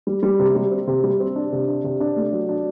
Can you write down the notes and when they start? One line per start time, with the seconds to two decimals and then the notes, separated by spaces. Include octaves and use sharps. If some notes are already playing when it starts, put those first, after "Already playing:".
0.07 G3
0.23 G3
0.39 C3
0.55 G3
0.71 C4
0.87 C3
1.04 G3
1.20 C4
1.36 D4
1.52 C3
1.68 D4
1.84 C3
2.01 D4
2.16 A3
2.33 F#3
2.49 D4